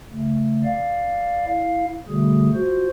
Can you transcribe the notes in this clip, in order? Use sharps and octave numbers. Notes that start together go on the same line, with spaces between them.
C#3 A3
D5 F5
E4 F5
B2 D3 G3 A3 G#4
F4 F#4 C5